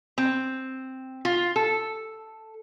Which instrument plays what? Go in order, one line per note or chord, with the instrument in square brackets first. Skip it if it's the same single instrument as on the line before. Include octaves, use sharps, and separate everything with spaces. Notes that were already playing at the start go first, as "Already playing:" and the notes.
[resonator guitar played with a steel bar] C4
F4
A4